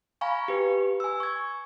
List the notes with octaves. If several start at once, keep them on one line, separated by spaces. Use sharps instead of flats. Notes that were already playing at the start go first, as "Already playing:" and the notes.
F5 G#5 A#5 B5 C#6
G4 B4
G#5 E6
C#6 G#6